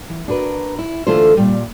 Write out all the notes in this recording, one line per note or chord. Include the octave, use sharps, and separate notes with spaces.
E3
D4 F#4 A#4 B4
E4
D3 E3 A3 F4 A4 C5
A#2 G3